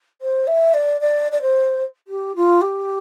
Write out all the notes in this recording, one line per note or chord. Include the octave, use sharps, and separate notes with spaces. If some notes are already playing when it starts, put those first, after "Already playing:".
C5
E5
D5
D5
D5
C5
G4
F4
G4